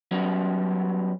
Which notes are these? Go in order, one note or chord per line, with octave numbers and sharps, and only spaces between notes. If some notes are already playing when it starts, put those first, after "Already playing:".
F#3 G3 B3 C#4 F#4